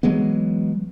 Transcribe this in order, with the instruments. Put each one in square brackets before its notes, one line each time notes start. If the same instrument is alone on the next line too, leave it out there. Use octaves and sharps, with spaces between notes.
[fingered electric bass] E3 F#3 G#3 B3